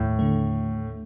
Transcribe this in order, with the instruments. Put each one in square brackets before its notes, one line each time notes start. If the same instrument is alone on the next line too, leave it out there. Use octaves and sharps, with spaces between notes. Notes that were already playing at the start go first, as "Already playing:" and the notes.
Already playing: [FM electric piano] D#2 [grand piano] A2
[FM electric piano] D3 A3